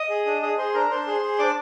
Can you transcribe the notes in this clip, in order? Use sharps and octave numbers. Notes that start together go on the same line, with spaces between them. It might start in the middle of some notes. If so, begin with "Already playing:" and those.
Already playing: D#5 D#6
G#4
D4
G#4 D#5 D#6
G#4 C5 C6
D4 A#4 A#5
D4 C5 C6
G#4
G#4
D4 D5 D6